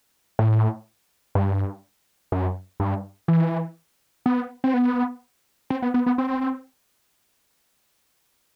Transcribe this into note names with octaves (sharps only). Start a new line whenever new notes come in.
A2
G2
F#2
G2
E3
B3
C4
B3
C4
B3
B3
B3
C4